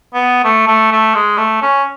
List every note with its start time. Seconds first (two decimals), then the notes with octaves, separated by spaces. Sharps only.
0.14 B3
0.44 A3
0.67 A3
0.92 A3
1.15 G#3
1.38 A3
1.62 C#4